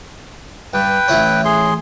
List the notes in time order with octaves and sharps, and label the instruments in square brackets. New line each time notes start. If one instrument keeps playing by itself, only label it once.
[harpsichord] G2 [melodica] B4 G5
[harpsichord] A1 E4 C#5
[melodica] G#4 C6